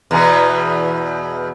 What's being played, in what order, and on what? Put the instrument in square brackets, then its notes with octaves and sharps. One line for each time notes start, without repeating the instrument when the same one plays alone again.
[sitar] E2 B2 E3